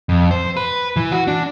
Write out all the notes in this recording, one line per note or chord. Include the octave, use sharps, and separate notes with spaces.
F2
C5
B4
E3
F#4
D4